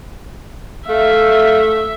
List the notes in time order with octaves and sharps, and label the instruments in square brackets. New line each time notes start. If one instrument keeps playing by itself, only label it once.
[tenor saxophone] A3 [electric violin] E5 [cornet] F5